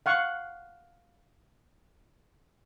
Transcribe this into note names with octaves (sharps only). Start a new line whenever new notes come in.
F5 F#5 C#6